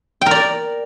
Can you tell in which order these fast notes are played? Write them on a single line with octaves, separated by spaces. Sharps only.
G5 A#4 D5